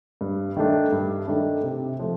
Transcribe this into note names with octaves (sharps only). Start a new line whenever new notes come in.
G2
D#3 A3 D4
G2
D#3 A3 D4
C3
F3 A3